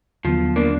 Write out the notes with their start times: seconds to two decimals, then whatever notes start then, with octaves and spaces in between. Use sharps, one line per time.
0.24 D#2 D3 F3 F#3 B3
0.56 A#3 D4